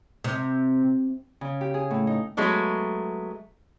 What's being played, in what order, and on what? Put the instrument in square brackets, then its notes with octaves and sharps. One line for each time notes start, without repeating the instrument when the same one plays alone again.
[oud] C3
[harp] C#3
G4
G#4
A2
D#4
[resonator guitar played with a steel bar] F#3 G#3 A3 B3